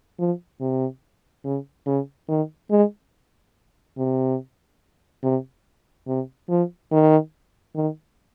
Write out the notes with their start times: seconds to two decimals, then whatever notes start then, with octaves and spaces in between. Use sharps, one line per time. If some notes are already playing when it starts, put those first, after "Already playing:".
0.19 F3
0.61 C3
1.44 C#3
1.87 C#3
2.28 D#3
2.71 G#3
3.97 C3
5.23 C3
6.08 C3
6.49 F3
6.92 D#3
7.75 D#3